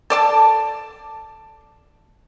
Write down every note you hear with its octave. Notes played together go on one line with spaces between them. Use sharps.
A4 D5 A5